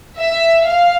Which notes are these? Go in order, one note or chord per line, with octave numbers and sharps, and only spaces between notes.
E5
F5